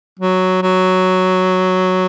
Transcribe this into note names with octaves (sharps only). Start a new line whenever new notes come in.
F#3
F#3